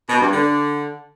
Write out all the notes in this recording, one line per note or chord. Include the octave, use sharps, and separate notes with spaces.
B2
G2
D3